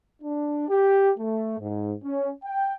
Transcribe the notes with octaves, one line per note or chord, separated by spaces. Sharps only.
D4
G4
A3
G#2
C#4
G5